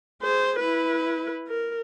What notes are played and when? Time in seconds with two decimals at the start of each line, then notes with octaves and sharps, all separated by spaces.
0.22 G#4 C5
0.60 E4 B4
1.48 A#4